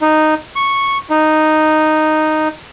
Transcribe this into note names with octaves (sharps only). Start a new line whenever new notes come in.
D#4
C#6
D#4